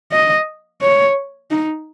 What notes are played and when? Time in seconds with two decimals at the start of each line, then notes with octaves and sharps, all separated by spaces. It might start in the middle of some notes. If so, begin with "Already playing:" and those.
0.12 D#5
0.82 C#5
1.51 D#4